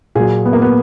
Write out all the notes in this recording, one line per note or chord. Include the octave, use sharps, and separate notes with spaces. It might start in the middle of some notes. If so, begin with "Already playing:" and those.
A#2 F#3 G#4
B3
A#3
B3